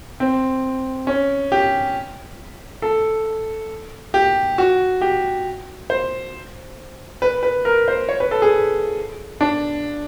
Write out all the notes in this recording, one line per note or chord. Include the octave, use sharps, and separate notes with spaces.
C4
C#4
G4
A4
G4
F#4
G4
C5
B4
B4
A#4
C5
C#5
B4
A4
G#4
D4